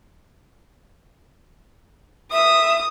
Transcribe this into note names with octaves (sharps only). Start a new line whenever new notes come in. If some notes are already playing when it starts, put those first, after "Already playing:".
E5 D#6